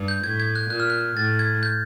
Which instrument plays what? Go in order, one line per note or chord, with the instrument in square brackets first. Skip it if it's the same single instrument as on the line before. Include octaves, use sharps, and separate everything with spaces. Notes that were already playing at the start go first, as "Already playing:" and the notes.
Already playing: [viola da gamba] G2
[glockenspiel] G6
[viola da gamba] A2 [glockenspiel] G#6
[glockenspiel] G#6
F#6
[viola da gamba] A#2 [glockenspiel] F#6
[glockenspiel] F6
F#6
[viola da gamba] A2 [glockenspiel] A6
[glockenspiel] G#6
G6